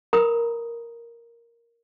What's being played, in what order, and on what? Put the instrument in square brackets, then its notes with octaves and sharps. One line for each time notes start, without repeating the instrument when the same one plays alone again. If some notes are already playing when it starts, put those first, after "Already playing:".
[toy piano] A#4 B4 A#5 B5 D#6